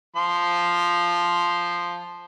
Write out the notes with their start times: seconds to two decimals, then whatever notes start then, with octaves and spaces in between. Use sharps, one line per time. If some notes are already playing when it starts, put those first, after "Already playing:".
0.16 F3 C6